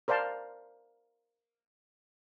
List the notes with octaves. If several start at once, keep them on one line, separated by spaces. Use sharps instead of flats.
A#4 C5 D5 F5 A5